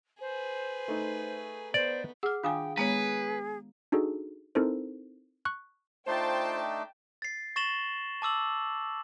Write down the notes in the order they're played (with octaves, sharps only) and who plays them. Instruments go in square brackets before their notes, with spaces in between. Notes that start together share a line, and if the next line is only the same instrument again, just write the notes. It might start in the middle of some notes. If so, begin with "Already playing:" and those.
[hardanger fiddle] G#4 B4 [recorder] C5
[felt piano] A3 D#4
[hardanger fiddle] B3 [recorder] C5 [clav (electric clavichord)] D5
[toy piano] G#4 F#5 [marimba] E6 F6
[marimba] D#3 D4 G#5 [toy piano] F4 F5 D#6 [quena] G5
[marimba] G#3 B3 C#5 [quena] G#4 [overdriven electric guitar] B4 [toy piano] A#5
[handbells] D4 D#4 F#4 G#4 A4
C4 D#4 E4 A4 A#4 C5
C#6 F#6
[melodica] A3 D4 D#4 [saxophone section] F4 C5 [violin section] G5 A5
[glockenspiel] A6 C7
C#6 A6 A#6 E7 F#7 G7
A5 D6 E6 F#7